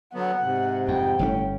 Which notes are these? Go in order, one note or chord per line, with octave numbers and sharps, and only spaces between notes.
D3 F#3 B3 F#5
G#2 C3
F2 G5
G1 A2 C#3 C#4